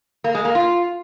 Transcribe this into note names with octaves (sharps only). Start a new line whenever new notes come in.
A#3
G#3
A#3
F4